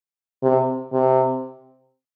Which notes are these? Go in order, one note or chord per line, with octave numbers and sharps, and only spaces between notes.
C3
C3